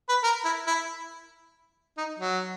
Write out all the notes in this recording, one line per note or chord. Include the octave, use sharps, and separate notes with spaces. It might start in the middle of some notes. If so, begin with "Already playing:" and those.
B4
A#4
E4
E4
D#4
F#3